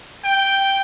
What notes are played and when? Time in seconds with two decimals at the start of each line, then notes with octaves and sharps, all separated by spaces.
0.24 G5